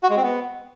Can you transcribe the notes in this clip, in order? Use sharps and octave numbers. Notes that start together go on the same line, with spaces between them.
F#4
G#3
C4
B3